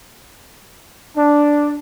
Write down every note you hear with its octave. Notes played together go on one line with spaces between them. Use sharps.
D4